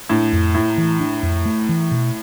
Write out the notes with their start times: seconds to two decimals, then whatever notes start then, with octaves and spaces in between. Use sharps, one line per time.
0.09 A2 D4
0.33 F2
0.54 A2 A3
0.78 E3
1.00 D4
1.23 F2
1.46 A3
1.69 E3
1.91 B2